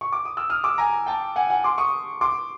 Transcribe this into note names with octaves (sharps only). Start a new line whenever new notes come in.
C#6
D6
D#6
E6
D#6 F6
D6 E6
G#5 A#5
G5 A5
F#5 G#5
F#5 G#5
C6 D6
C#6 D#6
C6 D6